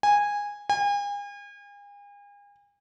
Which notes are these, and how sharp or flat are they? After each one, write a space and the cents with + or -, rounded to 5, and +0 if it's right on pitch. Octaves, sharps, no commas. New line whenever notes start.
G#5 -15
G#5 -40